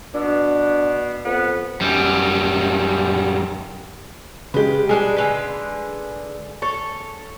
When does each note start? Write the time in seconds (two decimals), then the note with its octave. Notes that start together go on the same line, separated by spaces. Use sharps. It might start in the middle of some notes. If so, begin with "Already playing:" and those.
0.14 B2 D4
1.24 F2 B3
1.81 F#2 G3
4.54 C#3 G#3 G4 B4
4.89 G3 G#3 D4 G#4
5.17 D3 G#3 B4
6.62 A4 C#5